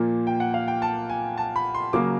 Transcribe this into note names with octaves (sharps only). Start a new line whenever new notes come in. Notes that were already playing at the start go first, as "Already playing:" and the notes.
Already playing: A#2 F3 A#3
G5
F#5
F5
G5
A5
G#5
A5
B5
C6
C#3 F#3 A#3 D6